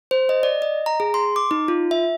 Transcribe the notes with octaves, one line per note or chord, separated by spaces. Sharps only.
C5
D#5
D5
D#5
A#5
G#4
C6
D6
D#4
F4
E5